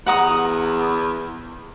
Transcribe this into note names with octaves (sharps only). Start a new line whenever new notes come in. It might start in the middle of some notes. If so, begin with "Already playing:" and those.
E2 F#5 A#5 D#6